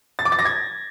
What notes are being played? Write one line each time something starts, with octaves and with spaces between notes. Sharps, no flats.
A6
D6
A6
A#6
G#6